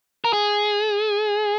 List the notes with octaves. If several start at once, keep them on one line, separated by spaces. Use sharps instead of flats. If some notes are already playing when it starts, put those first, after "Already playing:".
A#4
G#4